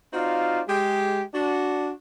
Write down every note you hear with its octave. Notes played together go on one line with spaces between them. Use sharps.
C4 D#4 F4 F#4 D5 F5
G#3 G4
D4 F#4